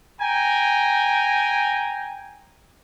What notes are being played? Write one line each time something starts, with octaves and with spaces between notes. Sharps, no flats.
G5 G#5 A#5